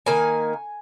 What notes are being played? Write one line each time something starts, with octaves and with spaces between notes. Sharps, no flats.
D#3 A#3 G#5